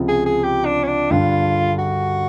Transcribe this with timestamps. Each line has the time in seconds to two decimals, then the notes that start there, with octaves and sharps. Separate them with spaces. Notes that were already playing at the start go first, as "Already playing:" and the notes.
Already playing: C#2 C3 F3
0.08 G#4
0.26 G#4
0.43 G4
0.66 D4
0.83 C#4
0.88 D4
1.11 G2 D3 G3 F4
1.79 F#4